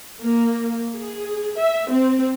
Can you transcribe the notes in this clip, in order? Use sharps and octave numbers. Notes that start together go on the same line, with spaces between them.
A#3
G#4
E5
C4